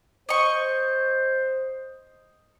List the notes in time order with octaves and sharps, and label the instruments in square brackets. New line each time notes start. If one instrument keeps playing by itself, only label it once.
[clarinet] C5 [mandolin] D#5 C#6